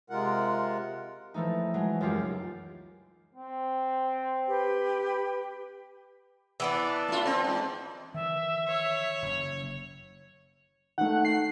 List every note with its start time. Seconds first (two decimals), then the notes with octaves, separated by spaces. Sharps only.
0.10 C3 G#3 F4 A#4 F#5
1.34 E3 F3 A3 D#4
1.74 F#3 G#3
2.01 C#2 F#2 F4 G4
3.34 C4
4.48 G4 B4
6.60 E3 B3 D4
7.08 A3 F4
7.25 C4
7.44 G#2
8.14 D#3 E3 E5
8.68 C#5
9.22 F#1
10.98 D#3 A3 F#5
11.25 C7